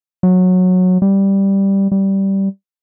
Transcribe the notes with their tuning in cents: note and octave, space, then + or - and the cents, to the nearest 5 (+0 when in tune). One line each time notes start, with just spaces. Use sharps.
F#3 -15
G3 +0
G3 -10